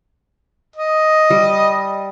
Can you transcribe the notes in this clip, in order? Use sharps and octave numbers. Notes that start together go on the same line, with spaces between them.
D#5
G3